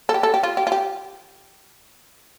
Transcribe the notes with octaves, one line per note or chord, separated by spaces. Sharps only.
A4
G4
A4
G4
F4
G4
F4
G4